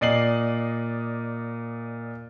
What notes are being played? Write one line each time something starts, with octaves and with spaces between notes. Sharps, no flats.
A#2 D5 D#5 C7 F#7